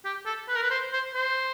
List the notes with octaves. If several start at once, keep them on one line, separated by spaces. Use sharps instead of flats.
G4
A4
B4
A#4
B4
C5
C5
C5